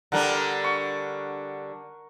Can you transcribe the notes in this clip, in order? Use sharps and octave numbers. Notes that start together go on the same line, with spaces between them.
D3 G3 D4 A#4 F#5
C#6